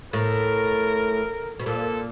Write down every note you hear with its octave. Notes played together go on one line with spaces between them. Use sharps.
A2 A#4
B2
A#2 A4